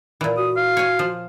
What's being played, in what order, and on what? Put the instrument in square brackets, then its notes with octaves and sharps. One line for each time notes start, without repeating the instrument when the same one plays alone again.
[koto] A#2 E3
[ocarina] F#4 [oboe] D#6
[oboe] F5
[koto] C#5 G#5
F3